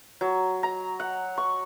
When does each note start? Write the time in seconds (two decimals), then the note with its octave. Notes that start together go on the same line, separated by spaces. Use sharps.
0.21 F#3
0.63 A#5
1.00 F#5
1.38 C#6